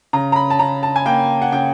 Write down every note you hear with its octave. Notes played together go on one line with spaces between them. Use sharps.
C#3 A#5
A#5
B5
A5
C#3 A#5
A5
G#5
A#3 G5
F#5
C#3 G5